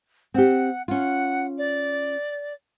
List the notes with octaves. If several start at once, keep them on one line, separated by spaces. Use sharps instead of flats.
C4 G4 F#5
C#4 F4 F#5
D5